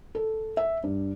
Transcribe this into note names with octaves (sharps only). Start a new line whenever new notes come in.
A4
E5
G2